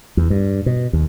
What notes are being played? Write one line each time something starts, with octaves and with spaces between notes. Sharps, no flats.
E2
G2
B2
D#2